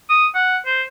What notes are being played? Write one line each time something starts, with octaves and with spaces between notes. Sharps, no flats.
D#6
F#5
C5